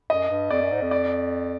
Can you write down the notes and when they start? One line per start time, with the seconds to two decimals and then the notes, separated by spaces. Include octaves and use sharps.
0.10 F#2 D#5
0.30 G2
0.51 F2 D5
0.62 F#2
0.72 G#2
0.82 F2
0.91 D5